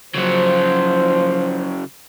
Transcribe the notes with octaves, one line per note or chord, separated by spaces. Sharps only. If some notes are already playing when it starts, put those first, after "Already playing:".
C#3 F3 F#3 C5